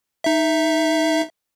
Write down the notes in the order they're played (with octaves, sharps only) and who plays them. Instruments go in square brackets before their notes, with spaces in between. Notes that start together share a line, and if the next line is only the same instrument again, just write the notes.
[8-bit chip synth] D#4 E5